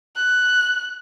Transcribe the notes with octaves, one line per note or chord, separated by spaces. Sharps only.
F#6